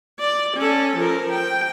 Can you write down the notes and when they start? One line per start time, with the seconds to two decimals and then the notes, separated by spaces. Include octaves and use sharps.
0.19 D5
0.57 C#4 A4
0.97 F3 A#4
1.32 G5